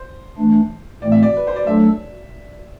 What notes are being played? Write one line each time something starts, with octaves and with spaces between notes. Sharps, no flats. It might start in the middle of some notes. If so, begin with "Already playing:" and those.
Already playing: C5
E3 A3 D4
A2 E3 A3 C4 D5
E5
D5
B4
C5
D5
F#3 A3 D4 A4 E5